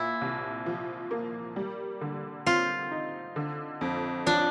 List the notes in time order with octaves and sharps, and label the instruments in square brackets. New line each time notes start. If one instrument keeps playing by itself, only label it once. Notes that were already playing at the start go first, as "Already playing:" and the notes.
Already playing: [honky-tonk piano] A#2 [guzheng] E4
[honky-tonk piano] C2
F3
A#3
G3
D3
[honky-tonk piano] C4 [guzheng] F4
[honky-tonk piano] D#4
D3
F2
[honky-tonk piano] F3 [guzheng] D4